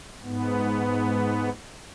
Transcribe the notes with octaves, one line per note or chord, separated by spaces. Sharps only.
G#2 B3